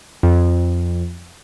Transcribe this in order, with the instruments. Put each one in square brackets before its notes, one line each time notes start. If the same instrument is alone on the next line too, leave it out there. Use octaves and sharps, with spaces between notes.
[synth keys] F2